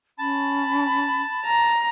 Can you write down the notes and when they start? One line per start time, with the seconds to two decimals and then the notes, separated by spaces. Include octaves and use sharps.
0.19 C#4 A5 B5
1.46 A#5